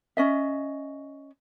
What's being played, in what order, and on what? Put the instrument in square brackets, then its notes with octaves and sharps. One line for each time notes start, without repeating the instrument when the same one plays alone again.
[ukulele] C#4 D#5 E5